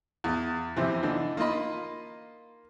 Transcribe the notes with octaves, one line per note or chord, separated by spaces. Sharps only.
E2
F2 C3 E3
D3 E3 D4 D#4
A#3 D#4 F4 D#5 B5